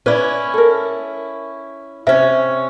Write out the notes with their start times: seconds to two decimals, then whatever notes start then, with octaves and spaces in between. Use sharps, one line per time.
0.06 C#4 E4 B4 D5
0.54 A4 A#4
2.07 C3 C#4 E5